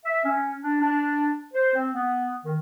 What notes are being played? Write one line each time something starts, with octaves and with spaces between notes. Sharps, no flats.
E5
C#4
D4
D4
C5
C4
B3
D#3